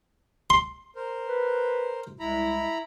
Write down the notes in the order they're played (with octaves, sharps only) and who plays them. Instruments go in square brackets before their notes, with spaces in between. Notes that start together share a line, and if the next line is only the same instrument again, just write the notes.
[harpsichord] C6
[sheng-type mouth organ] A#4 C5
[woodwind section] B4
[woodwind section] C2 G#3 [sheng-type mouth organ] E4 A#5 B5